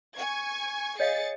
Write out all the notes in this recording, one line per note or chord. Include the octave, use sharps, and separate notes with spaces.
G#5 C#6 G#6
G#4 C#5 D#5 F5 A6 C#7